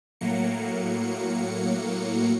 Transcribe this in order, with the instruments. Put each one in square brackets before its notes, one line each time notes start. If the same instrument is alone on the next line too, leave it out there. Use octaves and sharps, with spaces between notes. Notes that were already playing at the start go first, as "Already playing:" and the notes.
[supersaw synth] A2 F#3 A#3 C#7